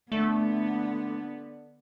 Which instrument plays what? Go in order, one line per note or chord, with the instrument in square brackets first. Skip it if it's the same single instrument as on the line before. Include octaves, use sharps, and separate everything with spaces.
[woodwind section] D3 [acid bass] A3 [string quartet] B3